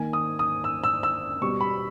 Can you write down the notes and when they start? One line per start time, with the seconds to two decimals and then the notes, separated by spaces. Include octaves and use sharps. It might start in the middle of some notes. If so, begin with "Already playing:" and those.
Already playing: D#3 A#3 G#5
0.13 D#6
0.39 D#6
0.64 E6
0.84 E6
1.03 E6
1.41 B2 G3 B3 C#6
1.61 B5